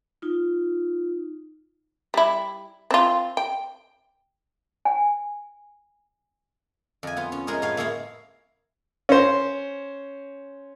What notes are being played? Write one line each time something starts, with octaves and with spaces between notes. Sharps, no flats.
D#4 F4
G3 E4
C4 F4
G5
G#5
F2 G#5
B3 F4
C#4
G#3 C#4 A#4 C#5 D#5
A2 B3 C#5 F5 G#5
A#3 E4 G#4 C#5 F5 A#5
C#4 C5